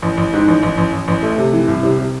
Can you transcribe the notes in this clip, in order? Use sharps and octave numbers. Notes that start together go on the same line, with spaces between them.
A1
A1
G#2
A1
A1
A1
A1
A1
A3
C3
E3
C2
C3
C3